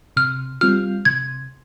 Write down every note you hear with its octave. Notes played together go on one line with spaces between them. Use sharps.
C3 F6
G3 C4 F4 F6
C3 G#6